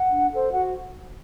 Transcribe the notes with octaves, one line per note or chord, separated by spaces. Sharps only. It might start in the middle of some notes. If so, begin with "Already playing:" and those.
Already playing: F#5
D4
A4 C5
F#4 F#5